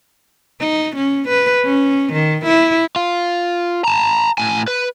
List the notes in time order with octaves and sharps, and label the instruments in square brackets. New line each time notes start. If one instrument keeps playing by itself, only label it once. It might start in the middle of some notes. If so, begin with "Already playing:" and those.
[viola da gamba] D#4
C#4
B4
C#4
D#3
E4
[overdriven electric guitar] F4
A5 A#5
A2 G#5
B4